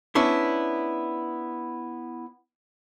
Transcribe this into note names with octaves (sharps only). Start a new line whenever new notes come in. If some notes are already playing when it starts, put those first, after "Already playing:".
B3 C#4 D4 E4